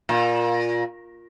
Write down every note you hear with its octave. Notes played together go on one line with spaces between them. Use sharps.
A#2